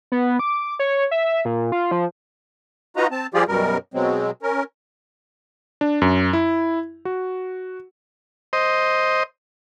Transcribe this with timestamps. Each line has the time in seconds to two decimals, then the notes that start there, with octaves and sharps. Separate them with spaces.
0.12 B3
0.39 D6
0.79 C#5
1.11 E5
1.45 A#2
1.72 F4
1.91 F3
2.96 D#4 F4 F#4 B4 D#5 A#5
3.11 C4 A5
3.34 F3 G3 F4 G4 G#4 D5
3.48 F#2 B2 G3 A#4
3.94 B2 F#3 G#3 C4
4.42 C#4 A#4
5.81 D4
6.02 F#2
6.33 E4
7.05 F#4
8.53 C5 D#5